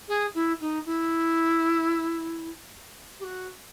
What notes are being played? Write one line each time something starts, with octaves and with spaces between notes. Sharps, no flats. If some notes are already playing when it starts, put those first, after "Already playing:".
G#4
E4
D#4
E4
G4
F#4